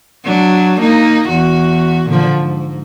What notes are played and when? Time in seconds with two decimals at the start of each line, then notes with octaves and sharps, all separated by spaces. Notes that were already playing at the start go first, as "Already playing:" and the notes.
0.24 F#3 D4
0.81 A#3 D#4
1.29 E2 F#4
2.07 A#2 D3 F3
2.38 G#2